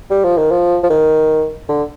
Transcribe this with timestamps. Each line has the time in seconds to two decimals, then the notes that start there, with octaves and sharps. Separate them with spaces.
0.11 G3
0.24 F3
0.38 D#3
0.51 F3
0.83 F3
0.90 D#3
1.69 D3